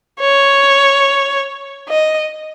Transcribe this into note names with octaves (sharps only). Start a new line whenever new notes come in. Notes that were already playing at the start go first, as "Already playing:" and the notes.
C#5
D#5